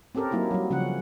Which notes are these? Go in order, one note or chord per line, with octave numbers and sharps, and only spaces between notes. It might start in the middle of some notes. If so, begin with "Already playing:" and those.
C4 C#4 G4 A4 A#4
F#3 A#3 D#4 E4
F#3 G3
C#3 F3 C#4 F#5